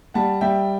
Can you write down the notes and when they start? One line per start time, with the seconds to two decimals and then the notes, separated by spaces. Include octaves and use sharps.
0.14 G3 F#5 A5
0.41 G3 E5 G5